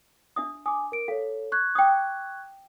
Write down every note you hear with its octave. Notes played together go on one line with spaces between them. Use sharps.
D4 E5 D#6
G#5 D6 D#6
A#4 D7
A4 C#5 F5
C#6 F#6 G#6
G5 D6 D#6